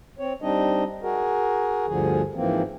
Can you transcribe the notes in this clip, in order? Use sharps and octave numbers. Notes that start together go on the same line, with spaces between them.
C4 C#5
G3 C4 D4 D#4 D#5
F#4 G#4 A#4
D2 G2 D3 F3 G#4
G#2 E3 F3 A#3 C4